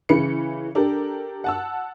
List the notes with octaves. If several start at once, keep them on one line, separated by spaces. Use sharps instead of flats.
C#3 E3 B5 C#7
D4 G4 A4 A#4
F#5 A5 E6